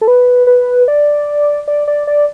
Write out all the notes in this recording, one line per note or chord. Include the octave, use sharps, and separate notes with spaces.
A4
B4
B4
D5
D5
D5
D5